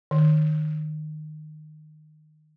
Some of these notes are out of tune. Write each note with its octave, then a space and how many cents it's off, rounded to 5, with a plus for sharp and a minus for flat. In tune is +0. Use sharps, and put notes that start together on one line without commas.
D#3 -20